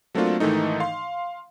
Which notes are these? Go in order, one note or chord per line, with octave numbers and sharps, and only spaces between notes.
F#3 A3 A#3 C4 D4 F4
G#2 D#3 E3 A3 D#4
F5 C6